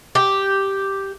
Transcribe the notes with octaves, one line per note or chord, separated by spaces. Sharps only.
G4